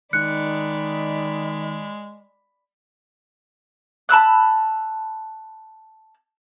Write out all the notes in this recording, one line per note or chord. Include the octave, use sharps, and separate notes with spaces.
D#3 G#3 D5 B5 F#6 C#7
A5 B5 E6 F#6